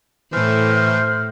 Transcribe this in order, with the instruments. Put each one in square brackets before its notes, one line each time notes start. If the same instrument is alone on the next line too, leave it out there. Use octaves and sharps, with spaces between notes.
[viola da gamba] A2 [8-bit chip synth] E3 A3 [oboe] C5 [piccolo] F6